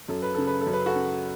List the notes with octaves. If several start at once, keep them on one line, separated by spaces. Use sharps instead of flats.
F#2 A4
B4
C#3 A4
B4
A4
F#2
B4
F#4 A4
C#3